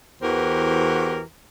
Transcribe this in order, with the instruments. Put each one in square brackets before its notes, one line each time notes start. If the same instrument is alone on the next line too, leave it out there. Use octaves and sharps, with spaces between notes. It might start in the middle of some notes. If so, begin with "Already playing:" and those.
[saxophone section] E2 E3 F#4 G4 A#4 C5